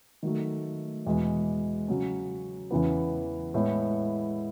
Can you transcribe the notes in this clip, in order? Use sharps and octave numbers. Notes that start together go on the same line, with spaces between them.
D#3 F#3 A3
E2 B2 G#3
C#3 F#3 C#4
E2 C#3 E3 B3
A2 G#3 B3 E4